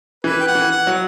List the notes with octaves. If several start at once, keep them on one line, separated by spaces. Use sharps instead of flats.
E3 B4
G5
F#5
E3
F#5
F#3